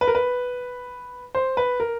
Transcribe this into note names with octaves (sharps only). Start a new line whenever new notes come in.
B4
A#4
B4
C5
B4
A#4